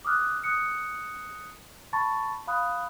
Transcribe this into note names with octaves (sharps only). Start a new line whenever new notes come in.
D6 D#6 F6 F#6
D#6 F#6 C#7
A5 B5 C#6 A6
F5 B5 D#6 F#6